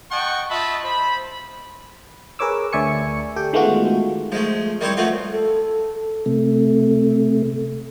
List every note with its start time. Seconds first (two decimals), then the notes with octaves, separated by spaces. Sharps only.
0.11 D#5 F#5 G5 A5 C#6
0.50 F4 D#5 E5 A5 B5
0.84 C5 B5
2.39 G#4 A#4 B4 C#5 D6 E6
2.73 D2 D5 E5 G#5 C#6 C#7
3.36 G4 A4 G5
3.53 D#3 G#3 A3 B3 F4 F#4
4.32 F3 G#3 A3
4.81 D#3 G3 C4 E4 C5 C#5
4.97 F3 A3 B3 C4 F4
5.32 A4
6.26 C3 A3